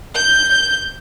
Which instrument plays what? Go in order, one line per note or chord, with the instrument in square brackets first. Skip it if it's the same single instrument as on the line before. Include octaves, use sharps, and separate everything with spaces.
[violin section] G6